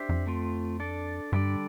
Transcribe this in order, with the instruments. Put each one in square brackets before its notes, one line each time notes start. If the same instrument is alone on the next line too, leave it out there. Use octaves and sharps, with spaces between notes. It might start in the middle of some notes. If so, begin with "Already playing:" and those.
Already playing: [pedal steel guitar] D4 G4 C5 E5
[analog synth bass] F2
[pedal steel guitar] A3 C4 F4
D4 A4 D5
[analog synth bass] G2 [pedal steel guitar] D3 G3 D4 A4 D5